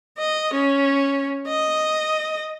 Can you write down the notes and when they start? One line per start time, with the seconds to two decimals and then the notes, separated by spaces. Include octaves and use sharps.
0.19 D#5
0.54 C#4
1.48 D#5